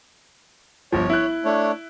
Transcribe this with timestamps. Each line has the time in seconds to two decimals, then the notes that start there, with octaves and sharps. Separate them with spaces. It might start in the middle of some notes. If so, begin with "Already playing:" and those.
0.93 G1 F3 C#5
1.10 E4 F#6
1.45 A3 D4 C#5